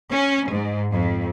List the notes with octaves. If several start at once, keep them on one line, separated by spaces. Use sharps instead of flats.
C#4
G#2
F2